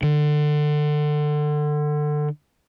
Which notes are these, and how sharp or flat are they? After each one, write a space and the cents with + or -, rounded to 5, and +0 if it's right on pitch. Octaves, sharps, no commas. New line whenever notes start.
D3 +25